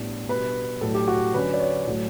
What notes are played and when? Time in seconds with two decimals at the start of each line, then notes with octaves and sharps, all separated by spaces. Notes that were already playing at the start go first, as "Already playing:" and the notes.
Already playing: A2 G3 B3 D4
0.29 B2 G3 D4 B4
0.81 A2 F#3 A3 D4 A4
0.94 G4
1.08 F#4
1.33 D3 F#3 C#4 B4
1.54 D5
1.60 C#5
1.86 A2 F#3 A3